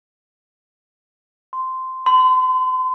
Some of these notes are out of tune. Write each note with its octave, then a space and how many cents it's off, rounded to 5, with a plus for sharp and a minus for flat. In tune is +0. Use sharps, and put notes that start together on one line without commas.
C6 -10
C6 -40